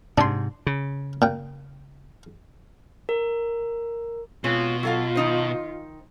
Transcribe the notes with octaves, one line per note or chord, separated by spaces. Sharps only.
G#2 C3 D4 C6
C#3
A#2 G5
A#4
B2 G#3 C4 F4 C#5
F#3 F4 A4 F5
D#3 D#4 C5